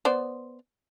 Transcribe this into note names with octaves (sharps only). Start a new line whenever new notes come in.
B3 C5 D5